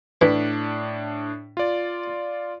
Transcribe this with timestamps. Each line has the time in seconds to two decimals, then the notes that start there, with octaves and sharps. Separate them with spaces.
0.21 A2 E3 D4 B6
1.57 F4 D5